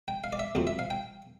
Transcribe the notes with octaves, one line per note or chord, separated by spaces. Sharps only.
G5
F5
D5
E5
D2 C3 F3
E5
F5
G5